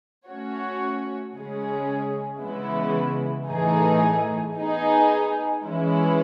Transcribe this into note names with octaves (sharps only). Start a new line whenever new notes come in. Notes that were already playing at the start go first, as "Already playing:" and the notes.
A3 C#4 F#4 C#5
C#3 G#3 C#4 G#4
C#3 E3 G#3 B3 E4
A2 E3 A3 D#4 G#4
B3 D#4 G#4
E3 G#3 C#4 E4